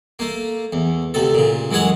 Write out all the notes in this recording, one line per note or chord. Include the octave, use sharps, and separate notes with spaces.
A3 A#3
E2
D2 C3 A4
A#2 C#3
F#2 E3 G#3 C#5 F#5